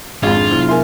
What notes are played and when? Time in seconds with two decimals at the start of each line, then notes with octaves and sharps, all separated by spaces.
0.23 G#1 F2 F4 G#4 F5
0.35 D4
0.51 C3 F#3 B3 E4 F6
0.69 A#4 E5 G#5 C6